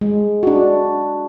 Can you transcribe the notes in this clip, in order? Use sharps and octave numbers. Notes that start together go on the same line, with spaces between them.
G#3
D4 F#4